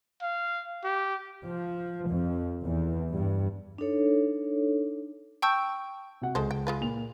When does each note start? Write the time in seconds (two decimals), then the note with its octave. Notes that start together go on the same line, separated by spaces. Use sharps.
0.22 F5
0.84 G4
1.45 F3
2.10 F2
2.64 E2
3.13 G2
3.78 D4 D#4 A4 C#5
5.42 G5 A5 C#6 E6 G6 D7
6.21 C3 F#4 F#5
6.35 C#2 G#3 A4 C5
6.51 G5
6.67 G#3 F4 B4
6.81 A#2 F7